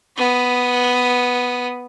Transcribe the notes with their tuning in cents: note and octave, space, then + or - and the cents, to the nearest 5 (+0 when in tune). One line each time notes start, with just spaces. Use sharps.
B3 +0 D#6 +0